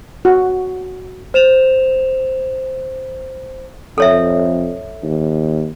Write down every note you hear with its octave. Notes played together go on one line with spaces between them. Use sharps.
F#4
C5 E7 F7
F2 A4 C#5 E5
D#2